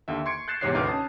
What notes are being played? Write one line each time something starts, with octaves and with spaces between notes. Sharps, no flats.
D#2 D3 E5
C6 C#6 G#6 C#7 D7
F#6 G6 A6 C7 E7
E2 G#2 C3 C#5 F#6 C7
G#1 D2 D#4 B4 D6 F6
C#4 A5 D#6